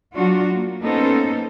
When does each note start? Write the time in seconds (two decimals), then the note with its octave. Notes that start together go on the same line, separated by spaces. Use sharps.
0.14 F#3 D4 F4 F#4
0.53 A#3
0.82 A#3 B3 C#4 D#4 A4 C5